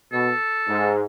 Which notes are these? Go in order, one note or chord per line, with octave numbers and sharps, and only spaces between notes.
B2 A4
G#2